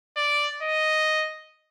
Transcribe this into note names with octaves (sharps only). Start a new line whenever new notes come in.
D5
D#5